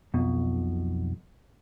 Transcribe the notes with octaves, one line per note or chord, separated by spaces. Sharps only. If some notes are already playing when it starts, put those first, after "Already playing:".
B1 F2 B2